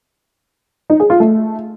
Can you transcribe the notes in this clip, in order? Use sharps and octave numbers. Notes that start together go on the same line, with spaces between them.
D#4
G#4
F4
A3